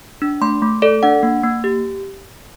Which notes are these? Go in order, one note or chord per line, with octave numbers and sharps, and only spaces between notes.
D4
A3 C6
A3
A4 D5
D4 F#5
A#3
A#3
G4